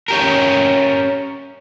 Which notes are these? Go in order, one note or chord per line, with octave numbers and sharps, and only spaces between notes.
C#4 G4 A#4